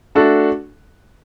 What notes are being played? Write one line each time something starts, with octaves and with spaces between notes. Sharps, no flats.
A3 D4 F#4 A4